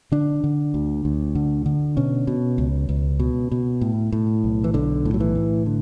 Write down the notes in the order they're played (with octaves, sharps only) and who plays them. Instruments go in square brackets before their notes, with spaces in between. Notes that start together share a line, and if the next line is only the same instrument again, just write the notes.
[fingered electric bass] D3 D4
D3
D2
D2
D3
D3
B2 C#4
B2
C#2
C#2
B2
B2
A2
A2
B1
E3
B1 D3
A2
F#3
E3
A2
D3